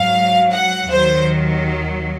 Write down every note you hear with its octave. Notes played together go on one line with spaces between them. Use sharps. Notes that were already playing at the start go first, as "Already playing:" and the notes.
Already playing: G#2 F#3 F5
F#5
D#2 D#3 F#3 C5